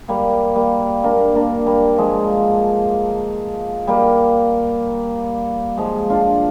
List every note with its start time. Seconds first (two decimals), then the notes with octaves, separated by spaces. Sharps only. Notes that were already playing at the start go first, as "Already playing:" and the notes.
0.08 G3 A#3
0.56 G3 A#3
1.03 A#3 D4
1.35 A#3 D4
1.66 G3 A#3
1.98 F3 G#3
3.87 G3 A#3
5.77 F3 G#3
6.10 D4 F4